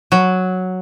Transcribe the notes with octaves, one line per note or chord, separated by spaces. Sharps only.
F#3